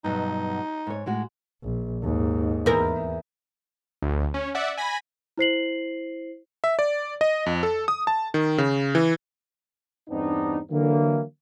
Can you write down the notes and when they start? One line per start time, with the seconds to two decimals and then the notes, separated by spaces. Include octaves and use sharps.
0.04 G2 B2 F#3 D#4
0.87 G#2 C#5
1.06 A2 G#3 F#4
1.63 A#1
2.03 D#2 G#2
2.66 E2 A#4
4.02 D2
4.34 C#4
4.55 D5 E5 F#5
4.77 G#5 B5 A#6
5.38 E4 C5 C7 F#7
6.64 E5
6.79 D5
7.21 D#5
7.46 F2
7.63 A4
7.88 D#6
8.07 A5
8.34 D#3
8.58 C#3
8.95 E3
10.10 E2 G2 B3 C4 D4 D#4
10.71 D3 E3 F#3 A#3